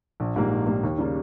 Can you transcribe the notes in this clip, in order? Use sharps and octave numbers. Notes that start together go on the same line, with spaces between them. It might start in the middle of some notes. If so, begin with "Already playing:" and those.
A#1
G#2 G3 A#3
A#1
G#2 G3 A#3
D#2
C#3 G3 A#3